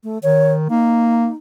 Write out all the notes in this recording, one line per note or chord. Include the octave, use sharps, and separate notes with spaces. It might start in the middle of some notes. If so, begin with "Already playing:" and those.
A3
D#3 C#5
A#3 D#4